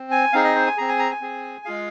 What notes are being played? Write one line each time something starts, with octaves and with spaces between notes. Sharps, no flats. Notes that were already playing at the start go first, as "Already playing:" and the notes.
Already playing: C4
G#5
C4 D#4 G#4 F5
D#5
C5
G#5
C4 G#4 A#5
G#5
A#5
G#5
C4 G#4
G#3 F4 G#4 F5